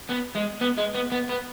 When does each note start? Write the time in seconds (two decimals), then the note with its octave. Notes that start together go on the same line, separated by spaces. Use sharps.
0.09 B3
0.35 G#3
0.61 B3
0.77 G#3
0.94 B3
1.12 B3
1.29 B3